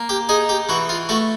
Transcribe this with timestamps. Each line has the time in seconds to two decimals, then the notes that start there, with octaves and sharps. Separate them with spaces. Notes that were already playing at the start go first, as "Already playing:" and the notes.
Already playing: A#3
0.09 G4
0.29 D#4 G#4
0.49 G4
0.69 E3 F#4
0.89 F4
1.09 A3 F#4